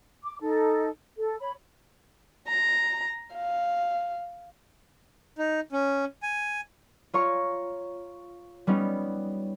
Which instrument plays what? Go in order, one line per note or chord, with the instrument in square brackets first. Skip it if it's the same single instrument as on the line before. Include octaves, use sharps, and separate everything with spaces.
[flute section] D6
D#4 A4
A4
C#5 B5
[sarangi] A#5
F5
[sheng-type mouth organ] D#4
C#4
G#5
[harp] F4 C#5 A#5 C#6
G3 B3 C#4 D#4